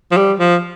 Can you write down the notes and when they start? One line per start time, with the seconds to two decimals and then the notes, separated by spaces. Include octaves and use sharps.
0.11 F3
0.17 G3
0.39 F3